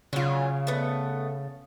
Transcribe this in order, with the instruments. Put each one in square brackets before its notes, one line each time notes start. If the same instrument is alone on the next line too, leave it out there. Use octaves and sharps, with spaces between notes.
[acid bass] C#3 [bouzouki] F#3 F4
[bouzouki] A3 B3